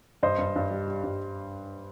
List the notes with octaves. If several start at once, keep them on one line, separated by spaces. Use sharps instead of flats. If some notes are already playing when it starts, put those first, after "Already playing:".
G2 C5 D#5
G2
G2
G3
G3
G2